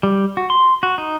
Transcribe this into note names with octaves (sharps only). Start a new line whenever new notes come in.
G3
F#4
C6
F#4
D#4